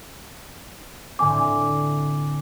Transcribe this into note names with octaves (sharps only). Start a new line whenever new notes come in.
A2 D3 C4 G#5 D6